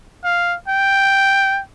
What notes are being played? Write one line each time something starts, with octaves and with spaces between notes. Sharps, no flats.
F5
G5